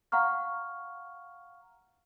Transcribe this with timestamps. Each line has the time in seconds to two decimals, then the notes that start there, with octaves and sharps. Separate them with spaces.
0.12 F5 F#5 A#5 C#6 F6